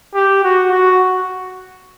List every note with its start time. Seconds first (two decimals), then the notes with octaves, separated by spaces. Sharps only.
0.15 G4
0.44 F#4
0.72 F#4